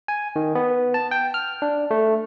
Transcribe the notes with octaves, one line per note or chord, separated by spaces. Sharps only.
G#5
D#3
B3
A5
G5
F6
D4
A3